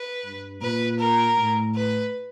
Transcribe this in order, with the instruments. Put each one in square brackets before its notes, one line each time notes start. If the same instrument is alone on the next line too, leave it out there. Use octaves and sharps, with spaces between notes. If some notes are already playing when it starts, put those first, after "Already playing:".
Already playing: [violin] B4
[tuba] G2
[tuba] A#2 [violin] B4
[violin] A#4
[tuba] A2
[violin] B4